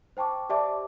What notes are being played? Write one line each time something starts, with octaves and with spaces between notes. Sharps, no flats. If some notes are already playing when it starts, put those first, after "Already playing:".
C5 G5 A5 C#6 D6
G4 C5 D5 E5 A5 D6